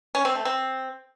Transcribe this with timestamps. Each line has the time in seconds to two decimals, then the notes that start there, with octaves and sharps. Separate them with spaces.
0.15 C#4
0.25 C4
0.35 A3
0.45 C4